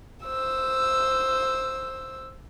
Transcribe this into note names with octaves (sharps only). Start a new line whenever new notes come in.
C5 E6